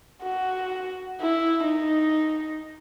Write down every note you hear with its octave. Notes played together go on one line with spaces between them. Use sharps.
F#4
E4
D#4